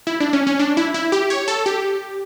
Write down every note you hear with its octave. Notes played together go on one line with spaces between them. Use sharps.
E4
D4
C#4
C#4
D4
E4
E4
G4
C#5
A4
G4